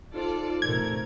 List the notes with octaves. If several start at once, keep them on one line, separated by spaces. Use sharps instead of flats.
D#4 F4 A4 C5 D5
E2 A2 C3 A3 A#4 G#6